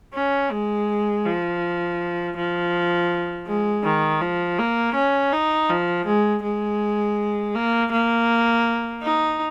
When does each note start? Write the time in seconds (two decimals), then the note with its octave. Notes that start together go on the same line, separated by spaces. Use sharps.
0.14 C#4
0.51 G#3
1.25 F3
2.37 F3
3.47 G#3
3.84 D#3
4.21 F3
4.59 A#3
4.95 C#4
5.33 D#4
5.70 F3
6.06 G#3
6.43 G#3
7.55 A#3
7.92 A#3
9.03 D#4